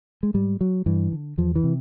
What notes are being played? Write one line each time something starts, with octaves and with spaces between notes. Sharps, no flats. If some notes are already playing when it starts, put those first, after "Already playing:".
G#3
G#2 G3
F#3
G2 E3
D3
E2 F3
E3
C3